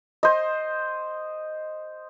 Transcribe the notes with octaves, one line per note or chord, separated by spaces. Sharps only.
C5 D#5